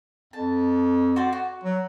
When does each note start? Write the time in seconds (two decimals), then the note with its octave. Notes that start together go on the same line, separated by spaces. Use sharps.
0.33 F2 A5
1.16 F#4 C5 D5
1.32 F#4
1.64 F#3